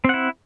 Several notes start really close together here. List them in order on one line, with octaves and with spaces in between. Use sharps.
C4 F#5 E4